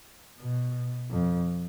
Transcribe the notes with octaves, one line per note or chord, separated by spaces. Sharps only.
B2
F2